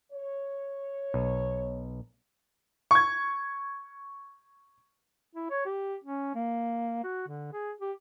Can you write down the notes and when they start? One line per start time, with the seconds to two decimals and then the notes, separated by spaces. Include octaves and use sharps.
0.12 C#5
1.14 B1
2.91 C#6 G#6
5.35 E4
5.50 C#5
5.65 G4
6.04 C#4
6.35 A#3
7.04 F#4
7.28 D3
7.53 G#4
7.81 G4